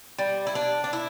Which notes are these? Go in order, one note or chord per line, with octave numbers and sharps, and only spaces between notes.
G3
E4
D4
D4
E4